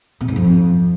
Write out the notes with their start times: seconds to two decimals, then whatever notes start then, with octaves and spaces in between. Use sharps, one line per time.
0.21 B2
0.28 G#2
0.36 F2